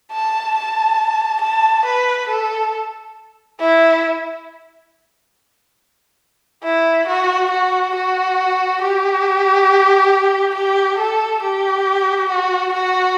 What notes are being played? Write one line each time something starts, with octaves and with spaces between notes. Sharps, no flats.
A5
A5
A5
B4
A4
E4
E4
F#4
F#4
F#4
G4
G4
A4
G4
F#4
F#4